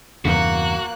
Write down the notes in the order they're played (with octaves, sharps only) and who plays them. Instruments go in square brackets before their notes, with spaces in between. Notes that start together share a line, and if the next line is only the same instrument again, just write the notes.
[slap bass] E2 G2 C#3 [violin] A#3 F#6 [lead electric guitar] F#4